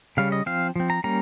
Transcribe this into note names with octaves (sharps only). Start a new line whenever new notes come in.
C#3 G3 C#4 F5
D#5
F3 C4 F5
F3 C4
A#5
G3 A#3 C#4 A#5